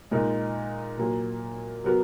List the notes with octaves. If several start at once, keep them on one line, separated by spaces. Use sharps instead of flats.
A#2 G#3 D#4 A#4
A#2 F#3 A#3
F#3 B3 F#4 A#4